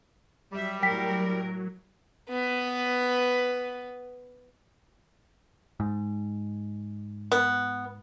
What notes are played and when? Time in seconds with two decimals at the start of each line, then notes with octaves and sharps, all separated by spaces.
0.52 F#3 G3 E5
0.83 A2 F#3 A#4 G5 B6
2.29 B3 B4
5.80 G#2
7.32 B3